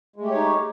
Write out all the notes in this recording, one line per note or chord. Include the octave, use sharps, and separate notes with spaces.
G#3 A3 D#4 G4 C#5